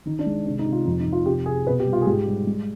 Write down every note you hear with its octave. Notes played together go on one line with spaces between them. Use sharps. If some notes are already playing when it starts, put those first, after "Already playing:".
D#3 D#4
D4
G#3
C3 D4
D#4
C3
F4
F2 D#4
D#4
F2
F4
C3 G4
C3 G#4
B2 B4
G4
G3
F4
G#4
G#2 G4
G3
G#3